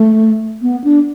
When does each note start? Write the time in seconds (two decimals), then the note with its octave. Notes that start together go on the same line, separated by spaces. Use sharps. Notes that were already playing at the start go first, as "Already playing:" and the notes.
Already playing: A3
0.62 B3
0.84 D4